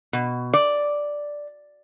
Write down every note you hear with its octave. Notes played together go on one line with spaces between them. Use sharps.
B2
D5